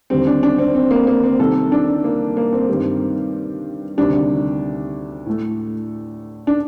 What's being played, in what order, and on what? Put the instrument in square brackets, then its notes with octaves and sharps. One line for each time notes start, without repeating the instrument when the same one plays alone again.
[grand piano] D#2 D3 G3 C4
D4
D4
C4
C4
A#3
A#3
C4
C2 C3 D#3 A4
D4
A#3
A#3
C4
G2 D#3 G3
D2 C3 D#3 G3 D4
A2 A3
D4